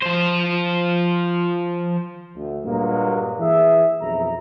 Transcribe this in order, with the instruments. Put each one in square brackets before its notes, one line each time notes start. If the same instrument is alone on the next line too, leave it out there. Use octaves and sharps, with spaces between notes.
[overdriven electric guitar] F3 C5
[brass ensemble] D2
G2 A#2 F#3 G#3 A#3
E3 G#4 E5
B1 F2 E4 A#5